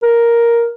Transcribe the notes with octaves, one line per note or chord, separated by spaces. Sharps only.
A#4